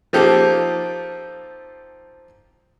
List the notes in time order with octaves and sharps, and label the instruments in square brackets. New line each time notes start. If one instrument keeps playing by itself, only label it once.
[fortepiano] F3 A#3 C4 D#4 G4 A4